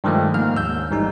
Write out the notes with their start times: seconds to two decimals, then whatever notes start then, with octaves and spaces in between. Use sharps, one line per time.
0.04 G2 D#3 F3 G#3 A3
0.34 G#2 A#3 F6
0.56 D#2 E6 G6
0.91 A1 G#2 G3 D#4